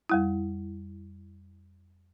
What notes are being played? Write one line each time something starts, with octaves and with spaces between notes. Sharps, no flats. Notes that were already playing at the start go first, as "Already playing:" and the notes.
F2 G3 E4